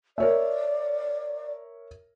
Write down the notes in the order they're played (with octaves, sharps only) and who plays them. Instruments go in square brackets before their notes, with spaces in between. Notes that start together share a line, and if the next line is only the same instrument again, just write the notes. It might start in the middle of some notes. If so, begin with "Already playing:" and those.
[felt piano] A#4 C#5 E5 [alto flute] D5